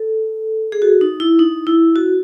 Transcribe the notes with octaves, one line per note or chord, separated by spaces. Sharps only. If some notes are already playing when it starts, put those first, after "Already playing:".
Already playing: A4
G#4
F#4
D#4
E4
D#4
E4
F#4